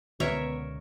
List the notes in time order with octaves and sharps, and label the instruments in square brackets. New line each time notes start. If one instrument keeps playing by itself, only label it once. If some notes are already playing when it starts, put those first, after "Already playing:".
[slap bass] C#2 B2 [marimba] D3 [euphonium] B3 [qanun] A#4 C#5 E5